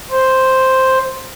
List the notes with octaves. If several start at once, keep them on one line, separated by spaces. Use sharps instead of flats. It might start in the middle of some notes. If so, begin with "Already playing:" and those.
C5